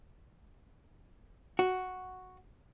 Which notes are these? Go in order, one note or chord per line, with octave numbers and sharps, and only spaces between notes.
F#4